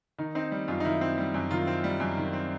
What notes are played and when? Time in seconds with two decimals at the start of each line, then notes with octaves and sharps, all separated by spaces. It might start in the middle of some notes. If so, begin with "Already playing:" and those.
0.18 D#3 D#4
0.35 C4 D#4
0.52 G3
0.68 F#2 F4
0.80 D#4
0.85 D#3 E4
1.01 C4
1.18 G3
1.34 F#2
1.51 D#3 F4
1.67 C4
1.84 G3
2.00 F#2
2.17 D#3
2.33 C4